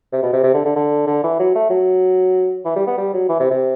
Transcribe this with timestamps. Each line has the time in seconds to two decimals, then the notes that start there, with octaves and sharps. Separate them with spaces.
0.12 C3
0.23 B2
0.33 C3
0.44 C3
0.54 D3
0.65 D3
0.76 D3
1.07 D3
1.24 E3
1.39 F#3
1.55 A3
1.70 F#3
2.65 E3
2.76 G3
2.88 B3
2.98 G3
3.14 F#3
3.29 E3
3.40 C3
3.51 C3